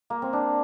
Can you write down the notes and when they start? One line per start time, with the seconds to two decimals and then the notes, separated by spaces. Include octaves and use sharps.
0.10 A#3
0.22 C4
0.33 D4